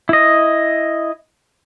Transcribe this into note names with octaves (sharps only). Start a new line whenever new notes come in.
E4 D#5